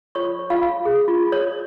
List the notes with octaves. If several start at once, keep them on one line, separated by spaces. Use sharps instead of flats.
F4 C#5 C#6
C#5
F4 F5
F4
G#4
F4
C#5